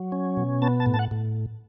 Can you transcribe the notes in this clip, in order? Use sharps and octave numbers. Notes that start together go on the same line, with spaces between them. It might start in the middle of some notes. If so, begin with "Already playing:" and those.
Already playing: F#3
C#4
B2
B3 A5
A5
A2
A5
F#5
A2